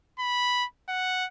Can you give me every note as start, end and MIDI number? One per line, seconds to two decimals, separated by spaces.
0.19 0.65 83
0.88 1.26 78